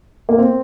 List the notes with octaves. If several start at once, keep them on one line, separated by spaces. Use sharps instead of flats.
A#3
C4